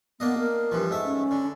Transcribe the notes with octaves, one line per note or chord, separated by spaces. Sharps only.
A#3 B3 D4 D#5
A#4
G2 E3 F3
G#2 A3 E5
C#4
D3